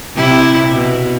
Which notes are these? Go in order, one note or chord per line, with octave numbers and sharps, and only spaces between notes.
C3 E4
B2